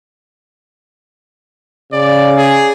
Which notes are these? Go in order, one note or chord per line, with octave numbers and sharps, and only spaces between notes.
C#3 D5
G#4